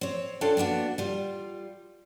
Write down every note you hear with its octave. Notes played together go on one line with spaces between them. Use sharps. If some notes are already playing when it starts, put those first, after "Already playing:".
C4 C#5
D4 F4 A4 C#5 D5 G5
A#3 B3 D4 F#4
G3 F4